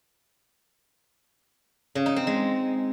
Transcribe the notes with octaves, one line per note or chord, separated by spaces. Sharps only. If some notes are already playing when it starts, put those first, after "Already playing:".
C#3
D#4
C4
G#3